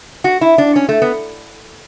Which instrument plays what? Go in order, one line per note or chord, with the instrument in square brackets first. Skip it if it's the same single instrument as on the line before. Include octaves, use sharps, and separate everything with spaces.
[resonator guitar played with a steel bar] F#4
E4
D4
C#4
A3
B3